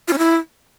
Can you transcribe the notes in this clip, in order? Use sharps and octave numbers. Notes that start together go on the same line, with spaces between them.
F4
C#4
E4